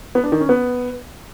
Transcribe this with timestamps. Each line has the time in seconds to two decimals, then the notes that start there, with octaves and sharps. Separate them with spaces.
0.15 B3
0.24 D4
0.32 D#3
0.41 C#4
0.49 B3